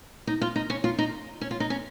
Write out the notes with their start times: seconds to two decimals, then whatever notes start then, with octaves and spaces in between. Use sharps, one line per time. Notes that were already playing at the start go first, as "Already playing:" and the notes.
0.27 D#4
0.41 F4
0.56 D#4
0.70 C#4
0.84 F4
0.98 D#4
1.41 C#4
1.51 F4
1.60 D#4
1.70 C#4